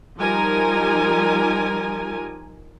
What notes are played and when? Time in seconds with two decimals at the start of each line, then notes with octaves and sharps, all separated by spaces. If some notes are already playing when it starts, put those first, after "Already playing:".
0.19 F3 G3 D#4 A#4 G#5